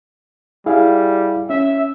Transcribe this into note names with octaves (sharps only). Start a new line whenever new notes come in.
G3 E4 G#4 F5
C#4 E5